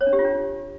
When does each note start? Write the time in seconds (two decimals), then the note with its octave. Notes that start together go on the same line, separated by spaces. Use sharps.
0.01 C#5
0.07 D4
0.13 G4
0.19 F4
0.25 D4